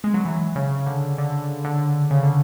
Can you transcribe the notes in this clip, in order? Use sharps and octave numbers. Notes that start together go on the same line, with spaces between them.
G#3
F#3
E3
C#3
D3
D3
D3
C#3
D3